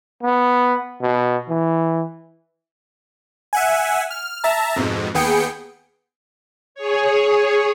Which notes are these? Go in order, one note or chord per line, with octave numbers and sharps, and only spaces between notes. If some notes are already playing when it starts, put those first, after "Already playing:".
B3
B2
E3
E5 F#5 G#5
F6
E5 A5 A#5
F2 G#2 B2
D#2 B3 G#4 G5 C#7
G#4 C#5